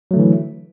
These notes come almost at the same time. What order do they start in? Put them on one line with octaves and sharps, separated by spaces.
F#3 A3 D3 E3